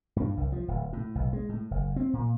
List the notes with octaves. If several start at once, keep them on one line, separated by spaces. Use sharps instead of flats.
G2
C2
F3
D1
A2
B1
G#3
A2
F#1
C4
A#2